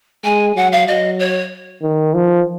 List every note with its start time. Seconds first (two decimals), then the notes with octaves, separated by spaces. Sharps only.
0.24 G#3 G#5
0.56 F#3 F#5
0.72 F5
0.88 F#3 D#5
1.19 C#5
1.83 D#3
2.14 F3